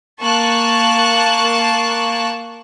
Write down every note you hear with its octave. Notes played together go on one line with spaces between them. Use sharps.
A#3 A5 C#6 F#6